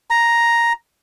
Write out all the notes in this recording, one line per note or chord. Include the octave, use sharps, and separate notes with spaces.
A#5